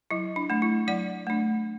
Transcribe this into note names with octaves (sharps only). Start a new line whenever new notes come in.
F#3 E4
D4
A3 D4
E4
F#3 D5 F#5
A3 D4